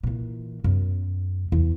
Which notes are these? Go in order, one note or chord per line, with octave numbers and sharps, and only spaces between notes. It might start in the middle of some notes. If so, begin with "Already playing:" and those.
A#2 E3
F#2 B3
E2